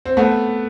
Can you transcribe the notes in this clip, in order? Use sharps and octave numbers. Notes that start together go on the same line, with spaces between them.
C4
A3 B3